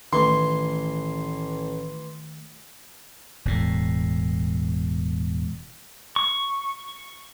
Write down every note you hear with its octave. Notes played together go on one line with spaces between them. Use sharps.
A1 D#3 E3 A3 C6
E1 A2
C#6